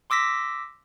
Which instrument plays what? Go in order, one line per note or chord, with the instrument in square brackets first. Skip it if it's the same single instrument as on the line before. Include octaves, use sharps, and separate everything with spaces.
[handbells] C6 D6 E6 A#6 B6